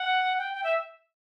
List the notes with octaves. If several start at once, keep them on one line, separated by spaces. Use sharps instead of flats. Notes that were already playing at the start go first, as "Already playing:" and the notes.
Already playing: F#5
G5
G5
E5